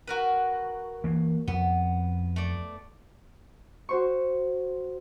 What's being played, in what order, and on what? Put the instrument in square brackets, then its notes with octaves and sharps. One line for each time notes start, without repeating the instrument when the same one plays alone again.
[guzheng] F#4 A#4 B4
[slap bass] E3 A#3
[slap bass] F2 [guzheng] B3
[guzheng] A3 D5
[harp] F#4 C5 C#6